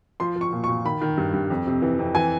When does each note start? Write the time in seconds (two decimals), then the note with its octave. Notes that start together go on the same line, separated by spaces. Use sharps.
0.20 F3 C6
0.36 F3
0.41 C#6
0.53 A#2
0.64 C#6
0.69 A#2
0.85 D#3 B5
1.01 D#3
1.17 G2
1.33 G2
1.50 F2
1.67 C3
1.82 E3
1.99 F2
2.15 E3 G#5